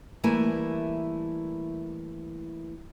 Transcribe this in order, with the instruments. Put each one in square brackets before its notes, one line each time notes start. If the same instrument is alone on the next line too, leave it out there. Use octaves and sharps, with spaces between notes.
[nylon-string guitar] E3 G3 A3 A#3 E4 G#5